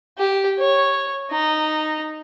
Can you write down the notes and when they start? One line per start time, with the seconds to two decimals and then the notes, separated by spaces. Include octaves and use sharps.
0.18 G4
0.59 C#5
1.31 D#4